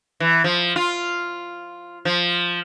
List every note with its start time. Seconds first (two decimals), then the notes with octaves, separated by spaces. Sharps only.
0.20 E3
0.44 F3
0.76 F4
2.05 F3